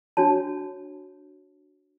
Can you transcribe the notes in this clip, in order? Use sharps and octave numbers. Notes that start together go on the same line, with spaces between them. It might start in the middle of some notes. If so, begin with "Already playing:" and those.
D4 F#4 C#5 A5